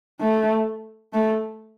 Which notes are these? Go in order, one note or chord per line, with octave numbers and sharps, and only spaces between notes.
A3
A3